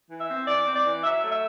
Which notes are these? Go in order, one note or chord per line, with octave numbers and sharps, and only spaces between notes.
E3
E5
C4
E3 D5
C4
D5
E3
F#3 E5
A3
E5